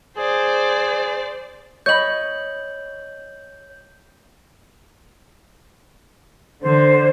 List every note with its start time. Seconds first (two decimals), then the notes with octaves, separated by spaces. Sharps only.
0.18 G#4 C5 D5
1.86 C#5 D#5 B5 G6 F#7
6.63 D3 C5